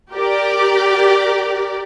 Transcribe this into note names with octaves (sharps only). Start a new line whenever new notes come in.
G4 A#4 D5